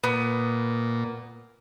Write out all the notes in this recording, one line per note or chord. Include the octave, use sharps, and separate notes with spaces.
A#2 B3